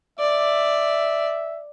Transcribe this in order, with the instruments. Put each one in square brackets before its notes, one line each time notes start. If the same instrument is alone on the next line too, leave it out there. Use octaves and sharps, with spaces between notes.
[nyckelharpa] D5 [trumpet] E5